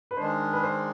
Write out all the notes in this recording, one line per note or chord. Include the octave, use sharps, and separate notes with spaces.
B4
D#3 G#3 D4 C5
B4
C5